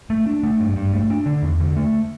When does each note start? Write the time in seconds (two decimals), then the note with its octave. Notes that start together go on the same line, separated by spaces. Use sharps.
0.10 A3
0.26 D4
0.43 A3
0.60 G2
0.76 G2
0.93 A3
1.10 D4
1.26 D3
1.42 E2
1.60 D3
1.76 A3